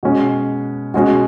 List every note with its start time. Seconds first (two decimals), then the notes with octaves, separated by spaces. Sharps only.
0.03 B2 G#3 C#4 F#4
0.94 B2 G#3 C#4 F#4